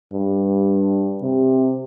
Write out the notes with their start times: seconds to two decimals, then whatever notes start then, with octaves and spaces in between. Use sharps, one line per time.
0.12 G2
1.22 C3